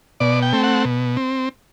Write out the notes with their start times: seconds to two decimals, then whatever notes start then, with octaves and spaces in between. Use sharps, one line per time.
0.20 B2 D5
0.42 G5
0.53 A3 C4
0.64 F#5
0.85 B2
1.17 C4